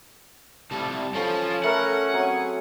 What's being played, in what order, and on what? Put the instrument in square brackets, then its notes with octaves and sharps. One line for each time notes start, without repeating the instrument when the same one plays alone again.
[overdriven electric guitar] C2 G3 [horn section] F3 A3 E4 [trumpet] A5
[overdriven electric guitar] F3 F4 [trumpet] C#4 [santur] A4 G#5 B5 [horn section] A5
[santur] A3 E5 B5 [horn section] A#4 [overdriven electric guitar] F#5
[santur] F#3 C4 E5 [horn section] G#4 G#5